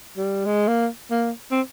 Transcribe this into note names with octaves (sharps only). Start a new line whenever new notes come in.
G3
G#3
A#3
A#3
C4